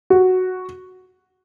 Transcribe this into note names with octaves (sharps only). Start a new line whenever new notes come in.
F#4